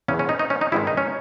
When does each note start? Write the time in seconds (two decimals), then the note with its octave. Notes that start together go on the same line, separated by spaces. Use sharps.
0.08 E2 C#3 E3 C#4
0.19 C#4
0.29 D#4
0.39 D#4
0.50 C#4
0.61 D#4
0.72 G#1 G2 D#3 G#3 E4
0.87 D#4
0.97 C#4